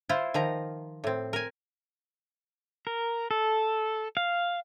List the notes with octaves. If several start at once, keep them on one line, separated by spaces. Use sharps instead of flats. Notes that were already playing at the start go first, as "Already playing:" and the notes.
E4 F4 C5
D#3 F3 A#5
A2 C4
A#4 G#5
A#4
A4
F5